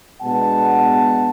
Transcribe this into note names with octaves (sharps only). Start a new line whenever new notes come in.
B2 G#3 B3 D4 F#5 A5